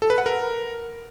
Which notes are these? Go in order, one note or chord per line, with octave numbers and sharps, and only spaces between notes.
A4
B4
F#5
A#4